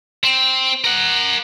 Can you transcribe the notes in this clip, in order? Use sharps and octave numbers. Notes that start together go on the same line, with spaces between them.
C4
A#4 F#5